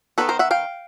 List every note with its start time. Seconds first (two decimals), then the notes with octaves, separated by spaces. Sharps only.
0.18 D#3 F#3 B3 D#4 A4 B4
0.29 A#4 C5
0.39 E5 F#5
0.51 F5 G5